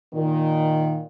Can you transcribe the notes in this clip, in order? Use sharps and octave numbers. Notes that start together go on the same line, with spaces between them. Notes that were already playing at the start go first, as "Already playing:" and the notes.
A#2 D#3